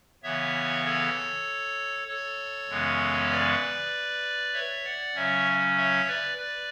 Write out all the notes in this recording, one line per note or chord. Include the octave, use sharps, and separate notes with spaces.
C#3 E3 B3 C#5 E5
A4 C#5
A4 C#5
F#2 C#3 E3 G#3 B3
B4 D5
C#5 E5
D5 F#5
C#3 F#3 C#4 C#5 E5
C#5 E5
B4 D5
B4 D5